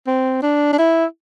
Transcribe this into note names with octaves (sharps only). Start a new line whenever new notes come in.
C4
D4
D4
E4